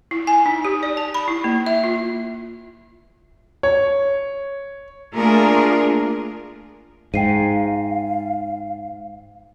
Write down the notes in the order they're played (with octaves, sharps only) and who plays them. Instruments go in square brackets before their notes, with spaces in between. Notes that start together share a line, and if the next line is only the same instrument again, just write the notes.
[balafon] E4
G#5
D#4
G4
D5
A5
B5
E4
A#3
E5
F4
[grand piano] C#5
[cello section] A3 A#3 D4 F4 G#4 A#4
[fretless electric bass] G#2 [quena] F5 [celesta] G5 C7 D#7